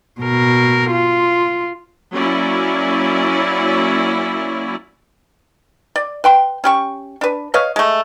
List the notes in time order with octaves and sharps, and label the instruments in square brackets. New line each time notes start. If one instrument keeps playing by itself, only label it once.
[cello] B2 A#4
F4
[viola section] F#3 A#3 C#4 E4 D5
[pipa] D5
B4 G5 C6
C#4 G4 C#6
D4 B4
B4 C#5 D#5 F5
G#3 A3